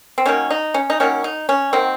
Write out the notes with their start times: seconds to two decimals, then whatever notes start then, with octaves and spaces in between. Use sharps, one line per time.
0.18 C4
0.26 D#3 F#3 A#3 C#4
0.51 D#4
0.74 C#4
0.90 D#4
1.00 D#3 F#3 A#3 C#4
1.24 D#4
1.49 C#4
1.73 D#3 F#3 A#3 C4